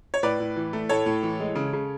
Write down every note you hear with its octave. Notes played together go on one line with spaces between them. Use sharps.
C#5
A2 B4 D5
A2
E3
A3
A2 A4 C#5
A2
E3
G#3
C#3
C#3